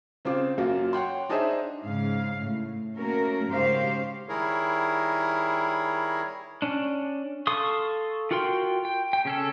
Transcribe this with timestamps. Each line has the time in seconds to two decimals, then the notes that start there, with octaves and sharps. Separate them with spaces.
0.25 C#3 C4 F4 C5 D6
0.58 F#2 F#3 A#3 F4 F#4
0.93 C#5 F#5 G5 C6
1.29 D4 D#4 G#4 C5 D#5 E5
1.83 G#2 C#3 F5
2.41 A2
2.96 A3 A#3 C#4 F#4 A#4
3.48 G#2 C#3 F#4 G4 C5 F5
4.29 D#3 G3 E4 G#4 A#4 C#5
6.62 C#4 D4
7.47 A4 F5 C6 C#6 D#6
8.31 F4 F#4 A#4 G5 C6
8.85 G5
9.13 G5
9.25 C#3 C#4 A4